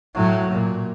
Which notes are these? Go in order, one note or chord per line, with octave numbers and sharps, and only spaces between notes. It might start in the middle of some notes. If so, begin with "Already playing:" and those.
A2 F#3
A#2